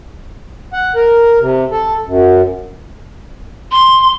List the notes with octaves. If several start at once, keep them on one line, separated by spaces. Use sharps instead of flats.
F#5
A#4
C3
A4
F#2
C6